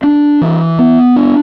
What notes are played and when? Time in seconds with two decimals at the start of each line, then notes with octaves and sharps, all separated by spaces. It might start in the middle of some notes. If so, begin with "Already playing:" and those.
0.03 D4
0.41 E3
0.79 B3
1.16 D4